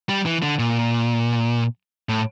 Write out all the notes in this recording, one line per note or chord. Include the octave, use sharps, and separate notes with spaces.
G3
E3
D3
A#2
A2